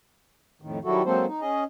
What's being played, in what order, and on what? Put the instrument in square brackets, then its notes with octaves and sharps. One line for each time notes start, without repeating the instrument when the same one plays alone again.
[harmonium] F2 A2 D#3
D#3 F#3 G3 E4 F#4 A4
F#3 G#3 A#3 C4 A4 C5
D#4
C#4 G#4 D#5